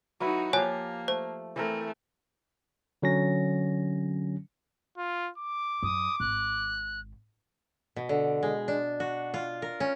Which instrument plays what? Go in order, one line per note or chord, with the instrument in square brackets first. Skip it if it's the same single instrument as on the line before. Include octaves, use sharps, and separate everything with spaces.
[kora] F#3 E4 B4 [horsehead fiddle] D#4 F#4
[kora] F3 G4 [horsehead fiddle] A#3 [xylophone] C#5 G#5 F#6
[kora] A3 [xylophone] C5
[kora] E3 C4 A#4 [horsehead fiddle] A3
[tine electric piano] D3 F#3 C#4 A#6
[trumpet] F4
D6
[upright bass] F#2 [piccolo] D#6
[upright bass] G#1 [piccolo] F#6
[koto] B2
D3
G#3
D4
F#4
F4
A#4
C#4